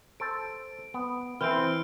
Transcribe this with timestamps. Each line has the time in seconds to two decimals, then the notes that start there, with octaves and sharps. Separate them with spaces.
0.20 A4 C5 A5 D7
0.94 B3
1.41 E3 C4 E4 F6 G6 D7